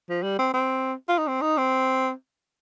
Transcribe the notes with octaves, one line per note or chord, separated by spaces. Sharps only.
F3
G3
C4
C4
F4
D#4
C4
D#4
C4